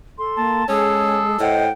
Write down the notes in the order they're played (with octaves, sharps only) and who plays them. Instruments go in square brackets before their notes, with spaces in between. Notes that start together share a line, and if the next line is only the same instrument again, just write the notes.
[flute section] A4 C6
[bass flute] A#3 [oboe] A5
[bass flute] G#3 [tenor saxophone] C#4 [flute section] G#4 D#6 [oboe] A4
[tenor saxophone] A2 [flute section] C5 F#5 G5 [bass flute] D#5